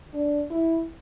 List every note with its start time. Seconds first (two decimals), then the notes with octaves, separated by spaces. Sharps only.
0.14 D4
0.50 E4